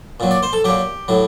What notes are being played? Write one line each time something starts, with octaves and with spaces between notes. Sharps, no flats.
A#2 F#3
D5
C5
A4
A#2 F#3 G4
A2 F#3